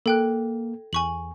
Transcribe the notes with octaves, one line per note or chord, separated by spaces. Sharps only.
A#3 A4 G5 F#6
E2 G#5 C#6 F#7